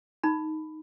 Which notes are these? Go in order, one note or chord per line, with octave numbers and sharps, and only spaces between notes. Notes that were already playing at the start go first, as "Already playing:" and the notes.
D#4 B5